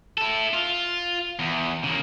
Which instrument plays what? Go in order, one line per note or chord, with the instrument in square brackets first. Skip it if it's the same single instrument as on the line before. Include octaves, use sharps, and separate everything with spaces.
[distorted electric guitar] E4 A4
F4
E2
C#3 A#3